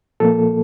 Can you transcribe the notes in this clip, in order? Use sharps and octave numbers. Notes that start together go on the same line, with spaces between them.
A#2 F3 A#3 A4